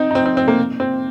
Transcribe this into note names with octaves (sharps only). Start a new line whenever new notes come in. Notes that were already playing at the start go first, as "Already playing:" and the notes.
Already playing: C4 D#4
D#4
C4
C4
C4
A#3
C4